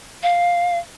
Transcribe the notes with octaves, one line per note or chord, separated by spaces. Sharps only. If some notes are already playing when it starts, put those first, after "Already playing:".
F5